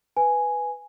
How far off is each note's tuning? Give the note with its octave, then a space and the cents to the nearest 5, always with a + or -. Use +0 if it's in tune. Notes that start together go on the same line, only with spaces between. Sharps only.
B4 +0 G#5 +0